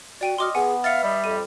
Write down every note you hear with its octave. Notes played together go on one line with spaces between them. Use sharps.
F#4 D5 G5 D#7
F#4 D#5 C6 D6 F6
B3 G#4 F#5 G#5
E5 F5 A6 C#7
G3 B4 D5 D#5
F2 D#7